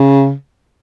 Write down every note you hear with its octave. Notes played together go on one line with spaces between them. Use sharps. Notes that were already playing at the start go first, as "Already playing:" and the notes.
Already playing: C#3